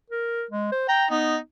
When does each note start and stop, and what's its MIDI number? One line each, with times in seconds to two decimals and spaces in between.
0.10 0.44 70
0.51 0.71 56
0.72 0.86 72
0.89 1.04 79
0.89 1.06 82
1.11 1.38 59
1.11 1.36 63